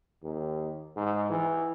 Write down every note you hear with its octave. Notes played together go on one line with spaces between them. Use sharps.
D#2
G#2
E3